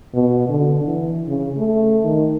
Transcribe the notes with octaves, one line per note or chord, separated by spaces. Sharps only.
B2
D3
E3
C#3
A3
D#3